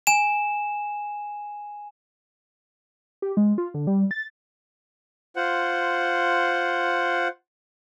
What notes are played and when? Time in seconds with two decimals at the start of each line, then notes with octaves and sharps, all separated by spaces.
0.07 G#5 E7
3.22 G4
3.37 G#3
3.58 F4
3.74 D3
3.87 G3
4.11 A6
5.36 F4 C5 F#5